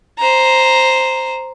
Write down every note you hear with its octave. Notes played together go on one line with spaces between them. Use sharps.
C5 A#5